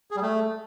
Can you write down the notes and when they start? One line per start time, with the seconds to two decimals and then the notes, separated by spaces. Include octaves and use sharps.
0.11 G#4
0.16 G3
0.22 A3